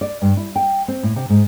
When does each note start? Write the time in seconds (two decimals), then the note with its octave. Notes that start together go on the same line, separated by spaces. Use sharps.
0.01 D5
0.22 G2
0.37 E4
0.56 G5
0.88 C4
1.03 A2
1.16 C3
1.30 G#2